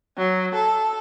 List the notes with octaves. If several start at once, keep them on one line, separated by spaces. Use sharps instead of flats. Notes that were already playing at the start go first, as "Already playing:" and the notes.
F#3
A4